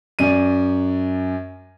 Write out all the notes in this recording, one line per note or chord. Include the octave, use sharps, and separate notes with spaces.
F#2 D5 D#7